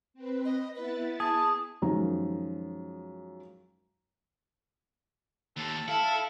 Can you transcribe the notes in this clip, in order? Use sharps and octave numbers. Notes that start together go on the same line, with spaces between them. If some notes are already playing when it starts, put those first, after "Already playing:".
C4 B4
D#5
B3 E4 B4 A6
G#4 A5
F#2 D#3 F3 G#3 A#5
D#2 A4
E4 A4 F5